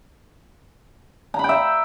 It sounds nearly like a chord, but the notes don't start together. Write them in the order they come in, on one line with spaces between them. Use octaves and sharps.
A#5 B5 G5 E5